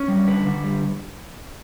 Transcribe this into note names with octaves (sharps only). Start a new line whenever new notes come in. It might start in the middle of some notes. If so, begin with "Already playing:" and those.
Already playing: C#4
G3
D3 B4
D3
G3